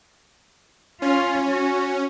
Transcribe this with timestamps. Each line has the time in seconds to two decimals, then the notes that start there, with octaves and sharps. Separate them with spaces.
1.02 C#4 F4
1.49 F#4